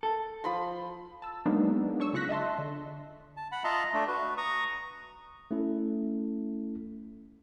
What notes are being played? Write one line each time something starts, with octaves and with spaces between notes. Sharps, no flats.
A4
F3 B5 C6
A5 E6
F#3 G#3 A#3 B3 D4 D#4
D4 C#5 C#6 E6
C#3 F4 C#6 F#6 A#6 B6
D#5 E5 A5 C6
D3
A5
F#5 B5
F4 D#5 E5 A5 A#5 C6
A3 D4
F#4 B4
A#5 C#6 D#6
A3 C#4 E4 A4